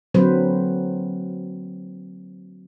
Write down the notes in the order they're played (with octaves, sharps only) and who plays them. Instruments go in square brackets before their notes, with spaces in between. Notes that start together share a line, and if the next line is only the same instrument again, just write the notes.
[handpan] D3 F#3 A#3 C4 B4 C5